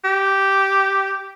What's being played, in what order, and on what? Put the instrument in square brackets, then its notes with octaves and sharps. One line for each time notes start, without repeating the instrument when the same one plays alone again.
[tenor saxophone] G4